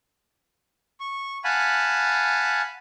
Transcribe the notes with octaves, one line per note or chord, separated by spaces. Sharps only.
C#6
F5 F#5 G#5 A5 B5